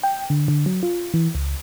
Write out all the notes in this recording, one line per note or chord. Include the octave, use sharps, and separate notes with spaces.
G5
D3
D3
F#3
F4
E3
C#2